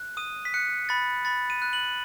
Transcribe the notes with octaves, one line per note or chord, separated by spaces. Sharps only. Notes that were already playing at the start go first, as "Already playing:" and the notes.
Already playing: F#6
D#6 D#7
B6
F#6 C#7
B5 A6
B5 A6
D#7
F#6
F#7